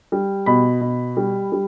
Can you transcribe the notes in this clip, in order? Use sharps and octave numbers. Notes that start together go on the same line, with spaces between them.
G3
B2 B5
B2
G3
G3